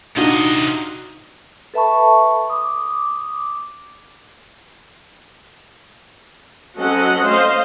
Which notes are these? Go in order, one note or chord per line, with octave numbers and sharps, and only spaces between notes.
D#1 C3 D4 D#4 F4 F#4 D#5
A4 B4 E5 A5 B5 C#6
D6 D#6
F#3 C4 C#4 A4 D#5 F#5
A3 C5 D#5 F5